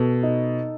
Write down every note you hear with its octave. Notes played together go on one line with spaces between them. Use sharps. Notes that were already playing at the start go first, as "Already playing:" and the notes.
Already playing: B2 A4
D#4